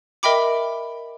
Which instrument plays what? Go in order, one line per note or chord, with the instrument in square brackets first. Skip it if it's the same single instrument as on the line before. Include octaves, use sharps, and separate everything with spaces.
[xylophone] A#4 D#5 E5 G5 B5 D6